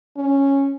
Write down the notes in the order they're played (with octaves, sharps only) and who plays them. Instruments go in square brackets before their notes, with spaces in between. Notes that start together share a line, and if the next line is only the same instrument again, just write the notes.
[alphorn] C#4